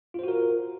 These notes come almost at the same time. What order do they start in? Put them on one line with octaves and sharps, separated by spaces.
F4 C5 F#4 A#4